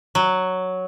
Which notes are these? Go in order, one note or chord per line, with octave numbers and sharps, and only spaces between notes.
F#3